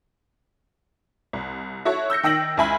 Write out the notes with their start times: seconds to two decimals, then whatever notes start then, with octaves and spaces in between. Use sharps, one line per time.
1.33 C2
1.85 E4 F#4 A4 C#5
2.10 E6 G6 A#6 C#7
2.23 D#3 G5 E6 A#6 F#7
2.57 C#2 E4 G#5 B5